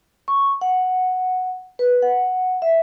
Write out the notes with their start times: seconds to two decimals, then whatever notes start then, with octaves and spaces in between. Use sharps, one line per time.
0.28 C#6
0.61 F#5
1.79 B4
2.02 F#5
2.62 E5